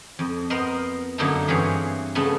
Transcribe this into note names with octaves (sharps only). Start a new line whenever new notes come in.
F2
B3 A#4 C5 D#5
F#2 D3 A#3 D#4 E4 A5
G2 E3 C4 F#4 G#4 C#5
C#3 F3 A3 B3 C#4